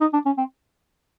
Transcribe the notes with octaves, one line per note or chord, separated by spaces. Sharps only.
D#4
D4
C#4
C4